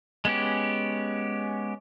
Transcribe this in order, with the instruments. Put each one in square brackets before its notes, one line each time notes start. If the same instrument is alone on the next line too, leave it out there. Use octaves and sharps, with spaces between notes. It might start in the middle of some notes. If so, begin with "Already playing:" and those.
[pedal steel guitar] G#3 B3 C#4 G4